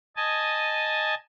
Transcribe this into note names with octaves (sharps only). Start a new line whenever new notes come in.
D#5 G#5 A5